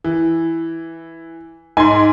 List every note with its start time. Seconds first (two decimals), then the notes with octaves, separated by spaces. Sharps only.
0.04 E3
1.77 G#2 G#5 C6